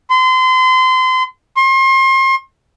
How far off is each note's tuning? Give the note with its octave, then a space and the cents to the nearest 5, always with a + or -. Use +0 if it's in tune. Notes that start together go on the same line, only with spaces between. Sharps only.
C6 -30
C6 +35